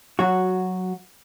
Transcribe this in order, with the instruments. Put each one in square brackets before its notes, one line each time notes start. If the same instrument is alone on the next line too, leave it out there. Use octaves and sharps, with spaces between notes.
[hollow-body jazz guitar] F#3 F#4